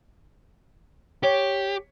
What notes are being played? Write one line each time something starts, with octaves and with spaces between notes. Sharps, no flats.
G4 C#5